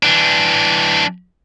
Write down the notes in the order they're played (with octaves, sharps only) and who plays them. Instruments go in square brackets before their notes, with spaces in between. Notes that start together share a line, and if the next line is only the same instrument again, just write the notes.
[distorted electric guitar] E3 D4